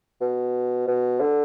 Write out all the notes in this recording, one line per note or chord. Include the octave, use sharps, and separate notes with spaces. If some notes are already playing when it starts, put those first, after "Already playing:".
B2
B2
D3